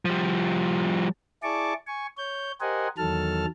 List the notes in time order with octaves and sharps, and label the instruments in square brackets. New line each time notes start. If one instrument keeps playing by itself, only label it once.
[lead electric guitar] F3 G3
[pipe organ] E4 G#4 D5 A5 C#6 D6
G#5 C#6
C#5 G6
G4 A#4 C5 D#5 F#5 G#5
E2 D#3 F#3 A4 A5 F6